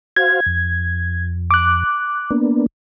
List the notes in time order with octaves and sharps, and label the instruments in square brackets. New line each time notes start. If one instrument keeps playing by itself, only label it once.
[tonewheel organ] F#4 C5 F5 [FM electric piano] G#6
[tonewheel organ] F2
[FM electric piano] D6 F#6
[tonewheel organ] A#3 B3 D4